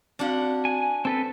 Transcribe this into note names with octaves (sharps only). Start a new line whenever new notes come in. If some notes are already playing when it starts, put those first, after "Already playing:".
C4 D4 F#4 F5 F#5
G#5
C4 A4 B4 A5